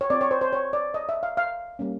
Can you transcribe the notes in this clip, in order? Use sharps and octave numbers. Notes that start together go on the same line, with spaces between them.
C#5
C4 F4 D5
C#5
C5
C5
C#5
D5
D#5
E5
F5
F5
G3 A#3 C#4